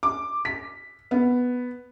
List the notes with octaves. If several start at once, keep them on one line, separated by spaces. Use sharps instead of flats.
D6
B6
B3